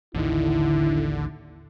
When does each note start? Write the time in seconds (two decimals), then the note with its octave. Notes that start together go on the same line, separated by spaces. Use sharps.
0.14 A1 D#2 D3 D#3 E4